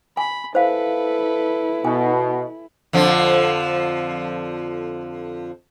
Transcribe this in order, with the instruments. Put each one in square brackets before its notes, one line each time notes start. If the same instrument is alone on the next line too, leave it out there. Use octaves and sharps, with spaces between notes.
[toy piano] G#5 [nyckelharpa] B5
[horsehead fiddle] E4 [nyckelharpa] A4 B4 [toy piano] C5 F5
[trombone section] B2 [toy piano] G#5
[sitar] F2 D3 F3